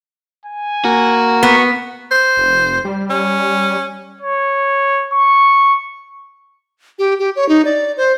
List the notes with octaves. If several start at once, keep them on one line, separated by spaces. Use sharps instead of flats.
G#5
A#3 F#4
B3 C#6
C5
F1
G3
C#4
C#5
C#6
G4
G4
C#5
D#4
D5
C5